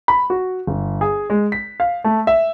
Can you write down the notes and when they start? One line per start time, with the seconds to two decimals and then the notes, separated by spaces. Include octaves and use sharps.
0.08 B5
0.30 F#4
0.67 G1
1.01 G#4
1.30 G#3
1.52 B6
1.80 F5
2.04 A3
2.27 E5